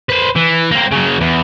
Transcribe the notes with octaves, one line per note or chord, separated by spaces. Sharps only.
B4 C5
E3
A#3 C4
C#3 F#3
E2